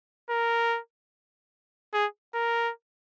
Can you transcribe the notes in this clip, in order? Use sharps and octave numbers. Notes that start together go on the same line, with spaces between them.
A#4
G#4
A#4